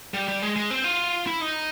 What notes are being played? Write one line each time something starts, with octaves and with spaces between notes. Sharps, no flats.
G3
G3
G#3
G#3
C4
F4
E4
D#4